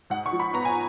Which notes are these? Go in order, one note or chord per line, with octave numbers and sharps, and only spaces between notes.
G#2 F#5
C#6
F3
B5
B3 A#5
G#5